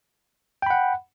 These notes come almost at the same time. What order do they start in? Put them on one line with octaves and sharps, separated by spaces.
G5 B5 F#5